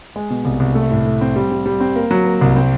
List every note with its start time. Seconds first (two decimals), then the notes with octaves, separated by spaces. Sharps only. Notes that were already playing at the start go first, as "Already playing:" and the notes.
0.16 G#3
0.30 B2
0.45 C2
0.60 C2
0.75 A3
0.91 A2
1.06 A3
1.21 C4
1.36 G3
1.51 G3
1.66 G3
1.80 C4
1.96 A#3
2.11 F#3
2.26 A#3
2.41 C2
2.56 C4